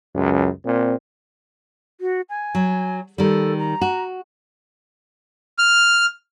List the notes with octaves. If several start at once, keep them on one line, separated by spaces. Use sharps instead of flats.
C#2 F#2
A#2 C4
F#4
G#5
F#3
D#3 G3 A4
A#5
F#4
F6